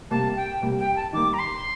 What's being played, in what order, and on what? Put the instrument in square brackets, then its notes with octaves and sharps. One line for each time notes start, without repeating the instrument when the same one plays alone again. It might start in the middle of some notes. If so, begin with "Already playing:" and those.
[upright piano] C3 G3 A#3 [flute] A5
[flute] G5
[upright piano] C3 G3 A#3
[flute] G5
A5
[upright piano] D#3 G3 A#3 [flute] D6
[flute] A#5
C6